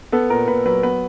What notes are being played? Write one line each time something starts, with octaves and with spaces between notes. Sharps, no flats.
B3 A4
A#2 A#4
A#2 B4
F#3 B4
B3 B4